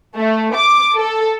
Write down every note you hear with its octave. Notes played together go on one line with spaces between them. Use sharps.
A3
D6
A4